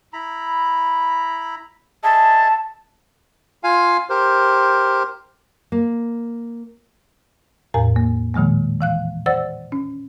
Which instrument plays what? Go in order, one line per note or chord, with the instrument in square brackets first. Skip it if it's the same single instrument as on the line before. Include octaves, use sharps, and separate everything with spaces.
[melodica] E4 A#5 B5
[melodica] G#4 D#5 E5 [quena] A5
[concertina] F4 F5 G#5
G4 A#4 C5
[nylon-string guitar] A#3
[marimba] E2 A2 A#4 G#5
A#3
A#2 D#3 F3 G#3 A#3
E3 F5 F#6
C5 D5 F#5 E6 A6
C#4